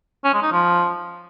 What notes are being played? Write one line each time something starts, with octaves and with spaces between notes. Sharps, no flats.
C#4
G#3
D#4
F3